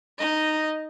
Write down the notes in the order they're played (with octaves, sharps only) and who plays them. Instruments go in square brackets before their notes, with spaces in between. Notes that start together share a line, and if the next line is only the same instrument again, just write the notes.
[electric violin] D#4 D#5